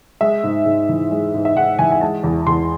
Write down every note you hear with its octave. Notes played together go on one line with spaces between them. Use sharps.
G#3 E5
G#2
G#2
E3
G#3
G#2
E5
G#2 F#5
E3 G#5
G#5
G#3 A5
E2
E2 C6